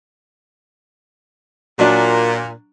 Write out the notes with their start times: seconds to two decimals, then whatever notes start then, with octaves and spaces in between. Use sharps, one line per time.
1.79 A#2 F#3 D4